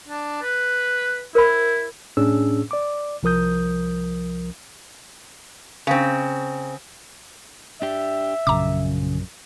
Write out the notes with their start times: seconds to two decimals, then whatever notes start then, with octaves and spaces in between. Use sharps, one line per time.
0.08 D4
0.42 B4
1.35 E4 A#4 C5 B5
2.17 A2 C#4 D4 G#4 E6
2.71 D5 D6
3.23 C2 F3 A#4 D#6 G6
5.87 C#3 C4
7.82 D4 G4 E5
8.47 A#1 F#2 C#3 A#5 D6